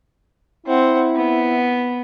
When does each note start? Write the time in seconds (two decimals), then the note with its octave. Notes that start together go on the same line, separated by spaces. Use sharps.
0.66 C4 E4 F#5
1.16 B3